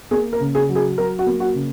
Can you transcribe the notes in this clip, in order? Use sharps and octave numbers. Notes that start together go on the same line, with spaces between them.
A#3 G#4
A#4
C#3
G#4
F#3
G#4
F#3 A#4
F#4
A#3
F#4
C#3